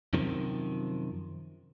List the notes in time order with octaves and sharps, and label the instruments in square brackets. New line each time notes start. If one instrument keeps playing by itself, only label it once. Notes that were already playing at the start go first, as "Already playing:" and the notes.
[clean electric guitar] F#2 C3 D#3 F3